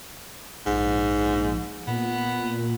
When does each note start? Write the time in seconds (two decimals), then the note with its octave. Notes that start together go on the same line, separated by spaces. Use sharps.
0.66 A#1 G#2
1.87 A#2 B3